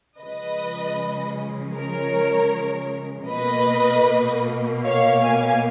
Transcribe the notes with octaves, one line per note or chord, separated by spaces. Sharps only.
C#3 F3 G#3 B4 D#5
A#4 C#5
B2 A#3 B4 D#5
C#5 F5
F5 G#5